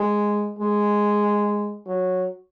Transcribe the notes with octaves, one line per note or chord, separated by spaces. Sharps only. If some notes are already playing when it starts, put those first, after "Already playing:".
Already playing: G#3
G#3
F#3